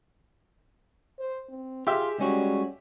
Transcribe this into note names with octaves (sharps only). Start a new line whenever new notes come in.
C5
C4
F4 G4 G#4 E5
G3 G#3 C#4 F#4